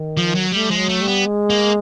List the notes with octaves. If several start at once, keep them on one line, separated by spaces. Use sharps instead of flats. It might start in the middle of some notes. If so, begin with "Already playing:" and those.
Already playing: D#3
F3
F#3
G3 A3
F3 G#3
F#3
A3
G3
B3
G#3
A#3